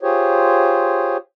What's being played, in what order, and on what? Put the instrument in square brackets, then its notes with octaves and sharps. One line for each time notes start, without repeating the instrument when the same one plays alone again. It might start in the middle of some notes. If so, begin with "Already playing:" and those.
[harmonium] F4 G4 G#4 C5 C#5